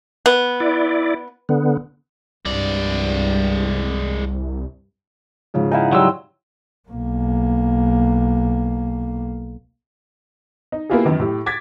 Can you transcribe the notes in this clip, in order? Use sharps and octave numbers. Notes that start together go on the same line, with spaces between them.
B3
E4 D5
D3 B3
C2 G2 G#3 D5
G#2 C#3 F3
D#4 E4 G#4 F5 F#5
F#3 G3 C6 E6
B1 A#3
D#4
A#3 B3 E4 F4 G4 G#4
F#2 D#3 E3
A2 G4
D6 G#6 A6 B6